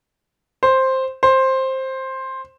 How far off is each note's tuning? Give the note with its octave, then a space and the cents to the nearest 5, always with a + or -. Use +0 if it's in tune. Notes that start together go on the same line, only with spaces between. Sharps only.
C5 +5
C5 +10